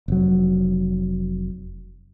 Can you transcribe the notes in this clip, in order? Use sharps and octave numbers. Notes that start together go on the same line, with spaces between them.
F1 F#3